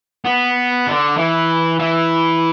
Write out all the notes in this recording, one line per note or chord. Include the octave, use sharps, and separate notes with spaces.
B3
D3
E3
E3